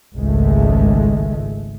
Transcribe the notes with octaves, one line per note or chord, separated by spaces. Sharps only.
G#1 C#2 G#3 A3